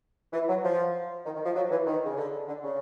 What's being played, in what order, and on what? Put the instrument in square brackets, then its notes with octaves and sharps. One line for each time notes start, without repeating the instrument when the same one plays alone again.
[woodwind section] E3
F#3
F3
D#3
D#3
F3
F#3
E3
D#3
C#3
D3
D3
C#3